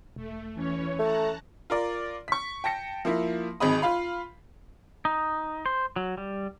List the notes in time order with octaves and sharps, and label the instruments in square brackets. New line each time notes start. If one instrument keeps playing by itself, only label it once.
[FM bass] E1 [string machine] A3
[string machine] E3 C#4 C#5
[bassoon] A3 [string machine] A5 A#5 F#6
[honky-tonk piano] F4 A#4 D5
C#6 B6
G5 A5 A#6 C#7
F3 A#3 E4
G#1 F2 G#4 D#5 B5 D#6
F4 F5 B5
[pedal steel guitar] D#4
C5
F#3
G3